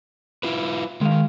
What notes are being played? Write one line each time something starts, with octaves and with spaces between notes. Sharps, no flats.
E4 F4 B4
D#3 G#3 F5